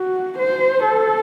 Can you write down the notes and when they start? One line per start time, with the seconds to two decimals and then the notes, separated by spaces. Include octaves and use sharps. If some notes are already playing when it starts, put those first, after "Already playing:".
Already playing: F#4
0.38 C5
0.85 A4